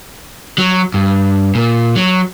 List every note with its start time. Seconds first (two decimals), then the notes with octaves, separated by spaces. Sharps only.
0.58 F#3
0.94 G2
1.55 A#2
1.96 F#3